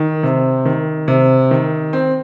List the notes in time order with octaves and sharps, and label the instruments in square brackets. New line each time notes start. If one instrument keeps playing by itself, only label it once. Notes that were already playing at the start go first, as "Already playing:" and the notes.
Already playing: [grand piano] D#3
C3
D#3
C3
D#3
C4